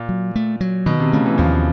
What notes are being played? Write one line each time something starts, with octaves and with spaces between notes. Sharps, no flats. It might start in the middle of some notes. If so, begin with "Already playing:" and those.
Already playing: A#2
F#3
A3
F#3
B2 D#3
C3
C#3 A3
E3
D#2 F3